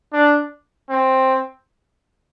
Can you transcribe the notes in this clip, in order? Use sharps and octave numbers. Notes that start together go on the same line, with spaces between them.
D4
C4